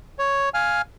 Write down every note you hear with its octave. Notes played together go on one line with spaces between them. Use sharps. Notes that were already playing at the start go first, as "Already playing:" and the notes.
C#5
F5 G#5 F6